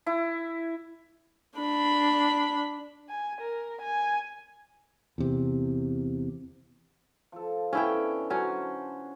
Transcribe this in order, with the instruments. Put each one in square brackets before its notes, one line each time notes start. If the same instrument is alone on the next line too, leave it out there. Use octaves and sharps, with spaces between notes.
[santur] E4
[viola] D4 B5
[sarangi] G#5
A#4
G#5
[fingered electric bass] E2 C3
[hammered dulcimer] F3 A4
[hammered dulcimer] D3 B3 [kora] C#4 E4 G5
[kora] F#3 C#4 [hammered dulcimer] D4 C5